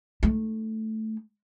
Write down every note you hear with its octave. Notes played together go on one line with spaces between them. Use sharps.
A3 D#4